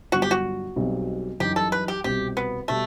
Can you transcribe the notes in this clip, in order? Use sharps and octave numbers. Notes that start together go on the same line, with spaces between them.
G1 G2 F#3 F#4
G4
F#4
B1 B2 G3 C4 D#4
F#2 E3 G3 D#4 G4
A4
B4
G4
C2 B2 G3 C4 G4
B3
B2 G3 A3